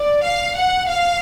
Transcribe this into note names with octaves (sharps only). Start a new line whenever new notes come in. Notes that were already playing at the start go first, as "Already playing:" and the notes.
Already playing: D5
F5
F#5
F5